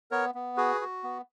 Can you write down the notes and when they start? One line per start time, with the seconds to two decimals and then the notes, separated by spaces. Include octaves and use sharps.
0.11 B3 A#4 C#5
0.35 B3
0.57 F#4 G#4 B4
0.81 F#4
1.04 B3